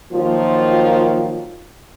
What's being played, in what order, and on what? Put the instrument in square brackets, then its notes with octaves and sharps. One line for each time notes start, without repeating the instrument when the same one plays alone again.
[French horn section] D#3 F3 F#3 A#3 F4